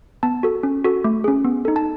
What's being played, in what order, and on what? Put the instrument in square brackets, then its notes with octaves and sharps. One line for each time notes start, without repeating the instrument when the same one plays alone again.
[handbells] B3 A5
F#4 A4
C#4
F#4 A4
A3
C#4 G#4
B3
D#4 A4
A5